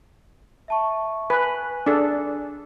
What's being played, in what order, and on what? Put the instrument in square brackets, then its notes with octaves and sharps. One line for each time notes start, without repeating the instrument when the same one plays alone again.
[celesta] E5 A5 C#6
[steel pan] B4 [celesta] G#5 F#6
[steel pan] D4 G#4 A4